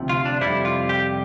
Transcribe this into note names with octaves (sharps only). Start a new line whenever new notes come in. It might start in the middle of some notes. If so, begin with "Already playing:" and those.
Already playing: D2 C3 F3
F4
D4
F2 C3 G3 E4
F4
G4